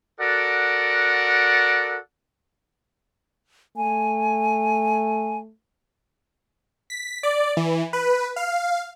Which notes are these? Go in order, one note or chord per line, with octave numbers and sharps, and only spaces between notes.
F#4 A4 A#4 D5 F#5
A3 G#5
B6
D5
E3
B4
F5